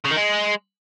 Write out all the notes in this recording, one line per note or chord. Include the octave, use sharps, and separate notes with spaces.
C#3
D#3
G#3